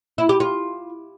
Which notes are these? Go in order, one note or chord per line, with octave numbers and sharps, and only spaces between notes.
E4
G4
F4